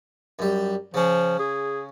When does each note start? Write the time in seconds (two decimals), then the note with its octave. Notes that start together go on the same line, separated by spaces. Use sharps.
0.39 F#2 G3
0.94 C#3 F3 C#4
1.39 G#4